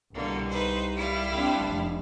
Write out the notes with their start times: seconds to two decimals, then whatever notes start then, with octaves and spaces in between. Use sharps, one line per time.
0.14 C2 B2 D3 A#3
0.50 D#4 B4 C5
0.94 G3 E4 F5
1.35 C4 D4
1.68 F1